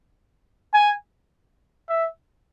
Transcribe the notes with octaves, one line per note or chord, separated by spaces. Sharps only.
G#5
E5